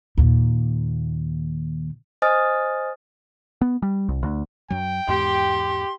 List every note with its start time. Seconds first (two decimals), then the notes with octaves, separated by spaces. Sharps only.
0.17 D#2 A#2
2.22 C5 D#5 G#5 D#6 F6 A6
3.62 B3
3.82 G3
4.09 C2
4.23 D2
4.70 F#2 F#3 G5
5.08 E2 G#2 G4 C6